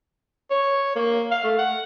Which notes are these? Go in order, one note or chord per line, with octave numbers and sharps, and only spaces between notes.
C#5
A#3
F5
A3
F#5